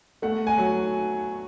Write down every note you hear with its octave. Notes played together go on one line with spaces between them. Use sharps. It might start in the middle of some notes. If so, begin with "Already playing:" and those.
A3 F#5
G#5
F#3